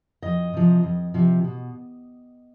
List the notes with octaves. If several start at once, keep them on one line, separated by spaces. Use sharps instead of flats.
F2 D#5
C3 F3
F2
C3 F3
B2